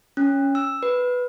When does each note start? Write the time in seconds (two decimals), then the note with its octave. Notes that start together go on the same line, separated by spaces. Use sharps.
0.17 C#4
0.55 E6
0.83 B4